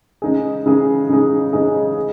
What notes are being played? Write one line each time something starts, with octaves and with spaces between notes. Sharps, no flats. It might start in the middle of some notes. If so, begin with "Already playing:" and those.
C#3 G#3 D#4 G#4
C#3 G#3 D#4 G#4
C#3 G#3 D#4 G#4
C#3 G#3 D#4 G#4
G#3